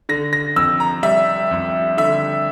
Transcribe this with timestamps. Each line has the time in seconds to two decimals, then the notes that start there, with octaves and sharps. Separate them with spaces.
0.09 D3 A#6
0.33 A#6
0.56 F2 E6
0.80 A#5
1.03 G3 E5
1.51 F2
1.97 D3 E5